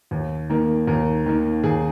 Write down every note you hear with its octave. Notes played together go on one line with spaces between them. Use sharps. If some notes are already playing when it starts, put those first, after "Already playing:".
D#2
D#3 A#3
D#2 A#4
D#3 A#3
D#2 G#4